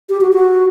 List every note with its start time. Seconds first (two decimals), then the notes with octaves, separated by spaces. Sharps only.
0.09 G4
0.21 F#4
0.32 F#4